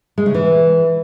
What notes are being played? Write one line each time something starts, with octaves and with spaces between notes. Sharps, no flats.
G#3
C#3
E3